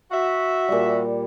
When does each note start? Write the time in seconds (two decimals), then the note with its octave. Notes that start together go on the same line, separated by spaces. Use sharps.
0.12 F#4 E5
0.68 A#2 G3